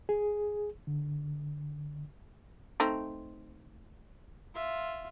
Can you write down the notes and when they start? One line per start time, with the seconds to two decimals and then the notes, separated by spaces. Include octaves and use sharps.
0.09 G#4
0.87 D3
2.80 A3 C4 D#4
4.54 F4 E5